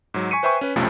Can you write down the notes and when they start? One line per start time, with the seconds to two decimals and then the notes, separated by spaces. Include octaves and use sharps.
0.14 G#2 F#3
0.31 G#5 C#6 B6 C#7 D#7
0.43 B4 C5 E5 G5 G#5 C#6
0.61 C#4 B4
0.76 B1 F2 C3 F3 A3 C#4